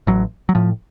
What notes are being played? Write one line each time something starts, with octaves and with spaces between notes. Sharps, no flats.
A1 F#3
F#3
A2 F3